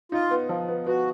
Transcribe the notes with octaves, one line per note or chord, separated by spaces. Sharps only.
D#4 F4
B3
F3
B3
B3 F#4